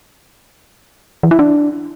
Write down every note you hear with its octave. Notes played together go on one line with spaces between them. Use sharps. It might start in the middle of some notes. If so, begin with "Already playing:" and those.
E3
E4
D4